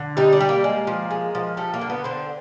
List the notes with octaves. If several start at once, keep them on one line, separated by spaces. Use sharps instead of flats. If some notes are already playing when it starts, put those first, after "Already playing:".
Already playing: D3
G3 D#4
D4
G3
A#3
G#3
F3
G#3
F3
G3 A3
A#3
D3
B3
D3 C4